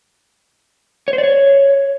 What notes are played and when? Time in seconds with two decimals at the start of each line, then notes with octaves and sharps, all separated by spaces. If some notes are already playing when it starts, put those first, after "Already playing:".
1.08 C#5
1.13 C5
1.18 D5
1.23 C#5